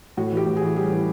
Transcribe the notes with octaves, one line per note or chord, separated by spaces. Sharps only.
A2 F#4
E3
G4
A2
E3 G#4
G3 G#4
E3